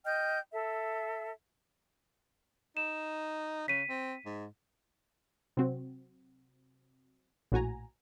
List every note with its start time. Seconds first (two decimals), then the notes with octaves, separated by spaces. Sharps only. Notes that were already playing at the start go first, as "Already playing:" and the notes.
0.04 D#5 G5 F6 G6
0.52 A4 E5
2.77 D#4 E7
3.68 C#3 B6 D#7
3.89 C4
4.26 G#2
5.57 C3 F#3 C4 F#4
7.52 A#1 A2 F#4 G#5 A#5